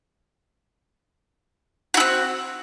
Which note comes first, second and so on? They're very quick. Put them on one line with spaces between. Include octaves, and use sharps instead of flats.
F#4 E4 C4